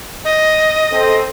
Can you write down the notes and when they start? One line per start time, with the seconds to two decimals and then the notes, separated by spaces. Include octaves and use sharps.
0.25 D#5
0.92 C4 A4